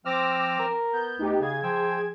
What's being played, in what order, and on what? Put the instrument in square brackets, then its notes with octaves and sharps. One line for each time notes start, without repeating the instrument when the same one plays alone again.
[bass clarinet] F3 [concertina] C4 E6 F6 [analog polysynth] D6 A#6
[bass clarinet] A#4
[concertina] B3 [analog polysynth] G6
[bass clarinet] D2 [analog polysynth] D#4 G4
[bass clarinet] C#3 [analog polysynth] G#4 G#6
[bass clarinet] F3 [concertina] G5 E6